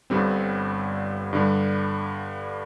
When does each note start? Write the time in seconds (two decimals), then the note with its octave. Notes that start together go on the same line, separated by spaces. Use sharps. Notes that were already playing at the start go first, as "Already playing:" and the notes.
0.10 G1 G2 D3 G3 C4
1.33 G2 D3 G3